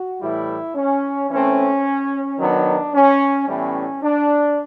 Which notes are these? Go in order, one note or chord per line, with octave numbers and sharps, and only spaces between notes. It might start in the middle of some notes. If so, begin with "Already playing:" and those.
Already playing: F#4
A2 E3 G3 E4
C#4
E3 A3 C4 C#4
D#3 F#3 B3 D4
C#4
A2 E3 G3 B3 C#4
D4